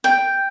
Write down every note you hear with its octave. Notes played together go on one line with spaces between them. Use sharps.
G5